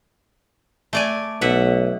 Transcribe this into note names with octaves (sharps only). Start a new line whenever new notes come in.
A3 D5 G#5
B1 B2 E5 F#5